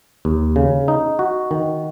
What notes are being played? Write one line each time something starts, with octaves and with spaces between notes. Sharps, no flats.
D#2
C#3
D#4
F#4
D#3